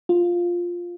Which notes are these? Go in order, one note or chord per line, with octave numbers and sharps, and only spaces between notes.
F4